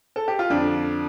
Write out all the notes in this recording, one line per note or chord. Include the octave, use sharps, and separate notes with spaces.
A4
G4
F4
F2 D3 D4